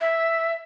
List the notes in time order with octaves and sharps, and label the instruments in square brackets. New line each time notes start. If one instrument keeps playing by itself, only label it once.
[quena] E5